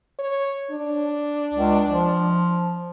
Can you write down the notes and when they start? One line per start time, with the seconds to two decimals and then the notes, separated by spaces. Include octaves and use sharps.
0.19 C#5
0.71 D4
1.54 C#2
1.88 F3